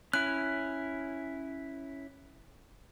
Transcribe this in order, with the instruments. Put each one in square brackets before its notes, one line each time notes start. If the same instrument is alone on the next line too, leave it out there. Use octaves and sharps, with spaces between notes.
[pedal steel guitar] C#4 E4 [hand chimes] F#6